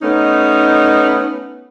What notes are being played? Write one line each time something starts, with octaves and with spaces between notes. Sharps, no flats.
A3 B3 C#4 D#4